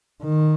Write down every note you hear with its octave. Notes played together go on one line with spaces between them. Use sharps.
D#3